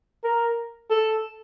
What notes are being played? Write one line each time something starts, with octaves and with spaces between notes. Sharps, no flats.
A#4
A4